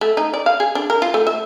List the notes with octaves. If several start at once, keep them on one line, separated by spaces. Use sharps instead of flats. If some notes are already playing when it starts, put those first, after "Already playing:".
A3
D#4
D5
F5
G#4
D4
A#4
F4
A3
E5